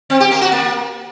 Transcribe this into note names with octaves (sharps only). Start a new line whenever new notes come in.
C4
G4
A#3
F#4
A#3